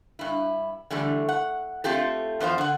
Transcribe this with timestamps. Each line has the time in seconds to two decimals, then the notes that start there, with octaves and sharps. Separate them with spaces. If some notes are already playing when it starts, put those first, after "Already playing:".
0.19 G2 E4
0.90 D3 E3 G3 A3
1.29 F#5
1.84 A3 C4 F4 G4 A4
2.40 E2 F3 C5 F5
2.58 D3 F#5